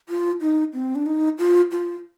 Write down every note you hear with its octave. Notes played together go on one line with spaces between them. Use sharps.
F4
D#4
C4
D4
D#4
F4
F4